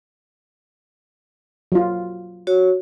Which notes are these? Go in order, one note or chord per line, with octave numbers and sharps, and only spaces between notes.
F#3 F4
F#4 C#5